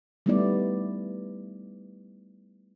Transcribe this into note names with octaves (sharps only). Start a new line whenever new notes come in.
G3 A3 B3 D#4 E4 D5